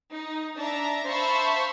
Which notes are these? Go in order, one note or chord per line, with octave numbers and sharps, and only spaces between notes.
D#4
D4 E5 A5 A#5
C5 E5 F5 A5 B5 C#6